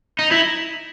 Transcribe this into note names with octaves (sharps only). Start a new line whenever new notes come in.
D#4
E4